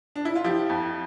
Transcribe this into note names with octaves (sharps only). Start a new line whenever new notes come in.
D4
E4
F4
F3 E4 G4
F2